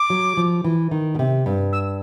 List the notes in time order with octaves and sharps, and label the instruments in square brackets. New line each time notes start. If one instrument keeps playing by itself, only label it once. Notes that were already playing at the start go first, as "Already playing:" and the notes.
Already playing: [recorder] D6
[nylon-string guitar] F#3
F3
E3
D#3
B2
C3
G2
[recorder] E6